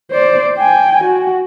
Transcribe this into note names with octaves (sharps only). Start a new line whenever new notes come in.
C5 D5
G5 G#5
F#4